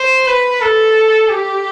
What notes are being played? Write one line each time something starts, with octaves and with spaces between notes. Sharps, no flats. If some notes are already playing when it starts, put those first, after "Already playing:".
Already playing: C5
B4
A4
G4